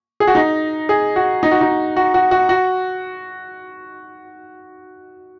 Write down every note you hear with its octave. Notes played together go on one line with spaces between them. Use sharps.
G#4
F#4
D#4
G#4
F#4
D#4
F#4
D#4
F#4
F#4
F#4
F#4